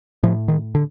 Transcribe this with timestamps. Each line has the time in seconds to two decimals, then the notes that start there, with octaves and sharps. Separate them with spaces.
0.23 A2 F3
0.48 D#3
0.75 D3